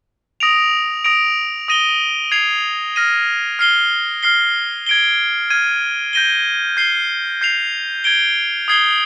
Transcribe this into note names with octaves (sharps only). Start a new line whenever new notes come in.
D#6 A#6 D7 F7
D#6 A#6 D7 F7
D#6 A#6 D#7 G7
G#6 C7 F7
F6 A#6 D#7
F6 C7 G7
F6 C7 G7
G#6 D7 G7
F6 G#6 D#7
G6 A#6 D#7 G7
G6 C7 G7
G6 C7 F7
G#6 D7 G7
D#6 G#6 C7 G7